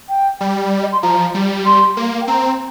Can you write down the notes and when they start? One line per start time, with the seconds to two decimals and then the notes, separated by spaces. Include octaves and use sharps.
0.09 G5
0.41 G3
0.82 D#5
0.92 C6
1.03 F3 A#5
1.34 G3
1.66 C6
1.97 A#3
2.21 G5
2.27 C4 A#5